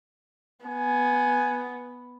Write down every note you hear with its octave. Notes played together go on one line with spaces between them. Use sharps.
B3 G#5